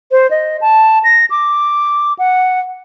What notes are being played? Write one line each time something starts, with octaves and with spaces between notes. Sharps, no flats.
C5
D#5
A5
A#6
D6
F#5